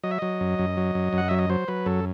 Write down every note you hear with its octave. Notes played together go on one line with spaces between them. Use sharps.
F#3 D#5
E5
F#3 D#5
F#2
F#2
F#3
F#2
F#2
F#5
F#3 E5
D#5
F#3 C5
F#3 B4
F#2 A4